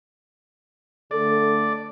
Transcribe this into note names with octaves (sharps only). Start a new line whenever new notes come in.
D3 A3 A4 D5